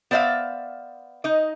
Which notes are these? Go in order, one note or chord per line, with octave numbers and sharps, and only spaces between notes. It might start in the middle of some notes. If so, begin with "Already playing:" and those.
B3 C5 D5 E5 F5
D#4 D#5